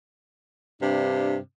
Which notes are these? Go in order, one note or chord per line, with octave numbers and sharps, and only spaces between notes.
G2 C3 D4